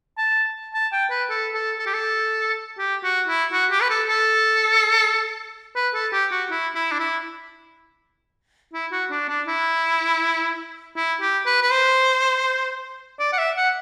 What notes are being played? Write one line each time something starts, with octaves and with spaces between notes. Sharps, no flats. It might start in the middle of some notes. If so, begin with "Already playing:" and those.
A5
A5
G5
B4
A4
A4
A4
G4
A4
G4
F#4
E4
F#4
G4
B4
A4
A4
B4
A4
G4
F#4
E4
E4
D4
E4
E4
F#4
D4
D4
E4
E4
G4
B4
B4
C5
D5
F#5
E5
F#5